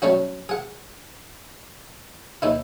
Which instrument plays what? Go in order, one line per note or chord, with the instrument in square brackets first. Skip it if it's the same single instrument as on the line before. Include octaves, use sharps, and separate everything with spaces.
[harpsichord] F#3 G3 A3 C#4 F#4
G#4 F#5
D#2 D#4 E4